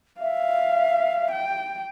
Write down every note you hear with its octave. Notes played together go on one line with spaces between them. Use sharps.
E5 F5
G5